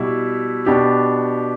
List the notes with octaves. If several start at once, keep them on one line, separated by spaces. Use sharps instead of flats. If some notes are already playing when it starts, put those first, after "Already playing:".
Already playing: B2 G3 E4
B2 B3 D4 G4